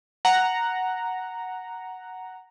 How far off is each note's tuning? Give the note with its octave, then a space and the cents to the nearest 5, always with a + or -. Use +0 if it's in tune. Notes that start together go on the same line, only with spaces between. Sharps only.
F#5 +0 A#5 +0